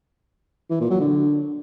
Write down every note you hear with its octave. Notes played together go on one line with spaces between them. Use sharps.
E3
A#2
F#3
D3